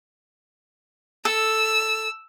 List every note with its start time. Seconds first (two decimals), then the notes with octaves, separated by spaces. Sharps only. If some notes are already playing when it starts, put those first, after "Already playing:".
1.25 A4 E6